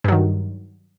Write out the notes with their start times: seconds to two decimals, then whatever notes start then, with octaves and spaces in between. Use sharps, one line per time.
0.04 G2
0.08 F#3
0.12 D#3